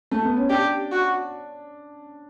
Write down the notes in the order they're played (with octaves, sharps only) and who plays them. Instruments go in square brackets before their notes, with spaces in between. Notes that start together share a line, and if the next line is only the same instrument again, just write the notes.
[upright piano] A3
B3
C#4
[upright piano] D4 [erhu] G4
[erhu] F#4